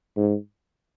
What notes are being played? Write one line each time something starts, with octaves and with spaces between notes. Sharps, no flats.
G#2